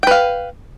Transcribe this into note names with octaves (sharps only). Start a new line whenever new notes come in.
B4 F5 G5